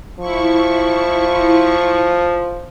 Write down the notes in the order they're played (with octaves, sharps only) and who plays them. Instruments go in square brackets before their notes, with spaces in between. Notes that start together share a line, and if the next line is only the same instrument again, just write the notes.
[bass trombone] F3 [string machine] E4 C#6